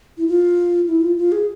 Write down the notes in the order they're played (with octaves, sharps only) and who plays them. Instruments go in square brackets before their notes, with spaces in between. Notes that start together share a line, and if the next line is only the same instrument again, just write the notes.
[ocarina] E4
F4
E4
F4
F4
G#4